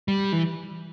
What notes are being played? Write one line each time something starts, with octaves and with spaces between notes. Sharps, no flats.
G3
E3